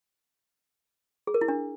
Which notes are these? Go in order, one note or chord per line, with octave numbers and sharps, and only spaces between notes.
G#4
A#4
E4
D4